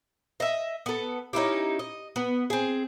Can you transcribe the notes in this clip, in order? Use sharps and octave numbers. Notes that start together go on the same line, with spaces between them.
D#5 E5
B3 A4
C#4 D#4 E4 G4
D#5
B3
C4 G#4